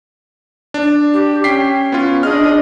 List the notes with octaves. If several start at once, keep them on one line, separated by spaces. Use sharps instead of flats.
D4
G4
C#4 G5 B6 C7
B3 F4
D4 G#4 D#5 F6